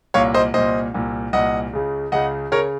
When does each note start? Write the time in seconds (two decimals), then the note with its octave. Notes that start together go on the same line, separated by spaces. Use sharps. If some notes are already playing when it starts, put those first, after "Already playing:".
0.14 C2 A#2 C#5 F5
0.34 C5 D#5
0.54 C2 A#2 C5 D#5
0.94 C2 A#2
1.33 C2 A#2 D#5 F#5
1.73 C#2 C#3
2.12 C#2 C#3 D#5 F#5
2.52 C#3 A#4 C#5